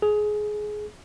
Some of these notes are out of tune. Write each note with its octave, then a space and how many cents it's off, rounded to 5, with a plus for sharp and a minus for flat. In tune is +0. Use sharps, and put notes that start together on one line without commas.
G#4 +20